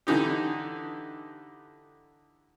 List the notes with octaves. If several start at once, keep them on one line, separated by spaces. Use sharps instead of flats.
D3 E3 D#4 G4